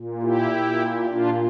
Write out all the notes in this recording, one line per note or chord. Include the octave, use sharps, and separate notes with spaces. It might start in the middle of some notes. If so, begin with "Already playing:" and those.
Already playing: A#2
E4 G4
A#2
A#2 D4 F4